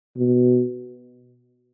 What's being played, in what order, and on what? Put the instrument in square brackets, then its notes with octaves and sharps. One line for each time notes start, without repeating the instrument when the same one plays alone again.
[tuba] B2